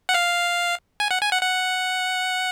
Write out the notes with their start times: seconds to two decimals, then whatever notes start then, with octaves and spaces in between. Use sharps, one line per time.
0.09 F#5
0.14 F5
1.00 G#5
1.11 F#5
1.22 G#5
1.32 F#5
1.42 F#5